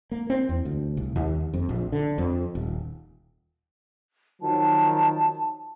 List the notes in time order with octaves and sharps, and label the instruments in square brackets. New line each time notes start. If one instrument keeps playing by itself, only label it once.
[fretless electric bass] A#3
C4
E2
D2
C2
D#2
F2
A#1
D3
F2
D#1
[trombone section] D#3 F3 F#3 [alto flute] A5